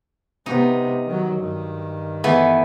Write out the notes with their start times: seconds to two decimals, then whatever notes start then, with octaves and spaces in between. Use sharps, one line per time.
0.46 C3 B3 D#4
1.06 D#3 F#3
1.39 G2 D#3
2.24 E3 A3 B3